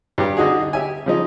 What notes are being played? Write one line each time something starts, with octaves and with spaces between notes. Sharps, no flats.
G2 G4
D3 D#4 F#4 G#4
G4 E5 G#5
C#3 F3 D#4